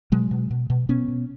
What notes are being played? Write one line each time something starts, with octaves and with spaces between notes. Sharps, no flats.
B2 F#3 G#3
B2
B2
B2
B2 B3 C#4
B2